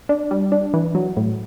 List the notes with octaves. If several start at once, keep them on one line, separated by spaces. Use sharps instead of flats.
D4
G3
D4
E3
F#3
A2